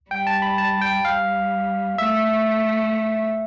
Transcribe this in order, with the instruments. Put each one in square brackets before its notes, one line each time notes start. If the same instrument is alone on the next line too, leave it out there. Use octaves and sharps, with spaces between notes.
[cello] G3 [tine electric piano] G5
[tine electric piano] A5
B5
A5
G5
[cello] G3 [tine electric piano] F5
[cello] A3 [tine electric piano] E5